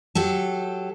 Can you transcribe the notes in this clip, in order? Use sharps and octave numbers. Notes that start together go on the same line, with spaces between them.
F#3 G4 A4